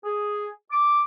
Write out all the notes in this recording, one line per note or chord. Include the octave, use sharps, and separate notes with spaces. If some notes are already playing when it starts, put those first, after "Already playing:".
G#4
D6